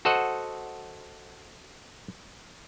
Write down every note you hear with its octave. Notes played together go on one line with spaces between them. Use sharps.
F#4 A4 C5 D#5 F#5